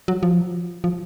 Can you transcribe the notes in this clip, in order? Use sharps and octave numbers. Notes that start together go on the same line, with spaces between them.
F#3
F3
F3